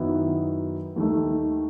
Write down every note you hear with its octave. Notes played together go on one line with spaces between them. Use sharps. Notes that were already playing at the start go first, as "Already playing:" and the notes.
Already playing: F#2 D#3 F#3 B3 E4
D#2 D#3 A3